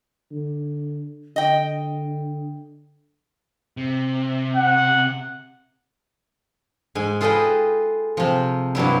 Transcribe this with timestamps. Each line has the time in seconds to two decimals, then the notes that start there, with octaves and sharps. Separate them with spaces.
0.31 D3
1.36 D3 D#5 G5
3.77 C3
4.56 F#5
6.95 G#2 G#5
7.21 F4 G#4 A4 B4 D#5 G5
8.17 C3 F3
8.75 G2 C3 F#3 E4